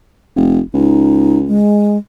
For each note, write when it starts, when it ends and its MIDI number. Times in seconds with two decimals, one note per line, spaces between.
0.36 0.60 29
0.74 1.60 37
0.74 1.39 63
1.48 1.97 56